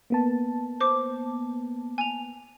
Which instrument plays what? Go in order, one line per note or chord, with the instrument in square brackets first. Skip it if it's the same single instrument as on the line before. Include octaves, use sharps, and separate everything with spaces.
[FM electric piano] A#3 B3 A5
[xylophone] C5 D6
G#5 F7